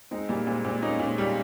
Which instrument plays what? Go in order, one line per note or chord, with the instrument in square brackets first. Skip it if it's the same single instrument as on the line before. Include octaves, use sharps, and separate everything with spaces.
[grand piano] G#3 C4 [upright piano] D#4
[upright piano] A#2 [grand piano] G3 A#3
[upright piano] A#2 [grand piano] G#3 C4
[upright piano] A#2 [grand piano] G#3 C4
[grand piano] A#3 C#4 [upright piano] D#4
[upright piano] A#2
[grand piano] G#3 C4
[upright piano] G3